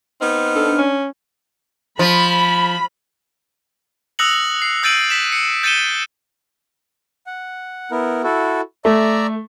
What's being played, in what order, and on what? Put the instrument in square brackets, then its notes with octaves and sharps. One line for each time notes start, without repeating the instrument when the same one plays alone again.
[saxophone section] B3 C4 D#4 [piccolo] F6
[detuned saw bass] D4 [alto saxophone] A4
[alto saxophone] C#4
[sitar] F3 [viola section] B5
[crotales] D#6 E6 F#6 A#6 C#7 F#7
C7
E6 G6 A6 D7 D#7 F#7
B6 E7
C#7
G6 A6 C#7 D#7 E7 G7
[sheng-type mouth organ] F#5
B3 E4 A#4
E4 F#4 A4
[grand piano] A3 [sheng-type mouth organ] D5 E5 A#5